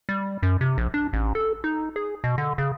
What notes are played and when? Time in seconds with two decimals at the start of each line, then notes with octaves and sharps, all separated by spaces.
0.09 G3
0.43 F#2
0.61 C3
0.78 A#1
0.94 D4
1.13 A1
1.35 A4
1.64 D#4
1.96 G#4
2.24 B2
2.38 D3
2.58 C#3